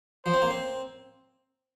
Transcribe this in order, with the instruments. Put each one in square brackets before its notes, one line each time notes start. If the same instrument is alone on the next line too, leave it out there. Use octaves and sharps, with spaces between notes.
[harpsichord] F3 [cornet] C5
[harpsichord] C4
A#3
C4